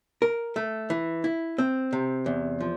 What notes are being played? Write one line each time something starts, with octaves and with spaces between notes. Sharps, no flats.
A#4
A3
E3
E4
C4
C3
E2
F3